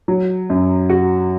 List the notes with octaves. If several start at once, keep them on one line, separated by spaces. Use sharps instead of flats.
F#3
F#2
F#4